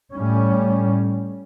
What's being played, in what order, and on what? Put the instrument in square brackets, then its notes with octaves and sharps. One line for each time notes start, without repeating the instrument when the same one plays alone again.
[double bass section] A2 G3 C#4